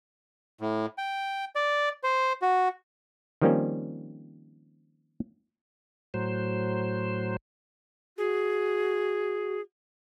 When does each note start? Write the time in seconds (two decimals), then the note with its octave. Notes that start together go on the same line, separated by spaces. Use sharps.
0.61 A2
0.98 G5
1.55 D5
2.03 C5
2.42 F#4
3.42 D#3 F3 G3 A#3 C4 C#4
6.14 A2 F#3 C5
8.18 F#4 G#4